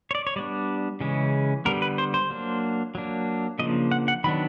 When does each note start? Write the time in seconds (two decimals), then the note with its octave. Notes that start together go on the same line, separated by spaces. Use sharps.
0.11 C#5
0.15 D5
0.27 C#5
0.36 G3 B3 D4 D5
1.01 C#3 E3 G#3 C#4
1.65 D3 G3 B3 A#4
1.82 B4
1.98 C5
2.14 C5
2.30 F#3 A#3 D4
2.95 F#3 A#3 D4
3.59 C#3 F3 A#3 D4 D#5
3.91 F#5
4.08 F#5
4.24 D#3 F#3 B3 D4 B5